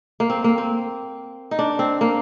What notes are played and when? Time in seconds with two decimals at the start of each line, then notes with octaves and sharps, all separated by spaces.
0.20 A#3
0.30 C4
0.44 A#3
0.58 C4
1.51 D#4
1.59 D4
1.79 C4
2.01 A#3